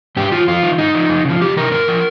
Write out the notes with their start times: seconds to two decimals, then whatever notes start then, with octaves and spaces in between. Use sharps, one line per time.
0.17 G#2 G4
0.32 D#3 F4
0.48 F2 F4
0.63 D#3
0.78 G#2 D#4
0.95 F3
1.10 F2
1.25 C#3 F3
1.41 F2 G4
1.57 C3 D#3 A#4
1.71 G#2 A#4
1.88 F3